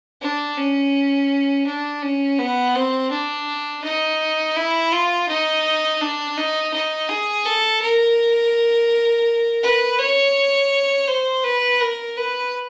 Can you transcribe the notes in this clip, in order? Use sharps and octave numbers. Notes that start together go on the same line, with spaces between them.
D4
C#4
D4
C#4
B3
C4
D4
D#4
E4
F4
D#4
D4
D#4
D#4
G#4
A4
A#4
B4
C#5
C5
B4
A#4
B4